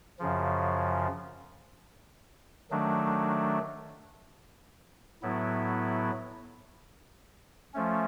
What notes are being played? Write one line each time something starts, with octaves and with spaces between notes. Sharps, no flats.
F#2 C#3 F3
D#3 F#3 A3 D4
A2 F#3 B3 E4
F3 A3 C#4